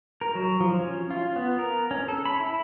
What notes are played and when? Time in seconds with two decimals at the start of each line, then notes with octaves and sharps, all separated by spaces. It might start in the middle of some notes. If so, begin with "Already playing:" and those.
0.21 A#4
0.35 F#3
0.60 F3
0.79 C#4
1.10 F4
1.36 B3
1.59 A#4
1.91 C#4
2.08 A4
2.26 B5
2.40 E4